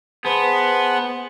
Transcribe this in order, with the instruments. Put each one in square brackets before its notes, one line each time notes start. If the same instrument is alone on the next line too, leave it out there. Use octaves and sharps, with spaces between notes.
[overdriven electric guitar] B3 [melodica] G#4 C5 A5